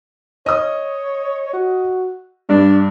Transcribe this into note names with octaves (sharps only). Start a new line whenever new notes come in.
C#5 D#5 D#6
F#4
G2 D4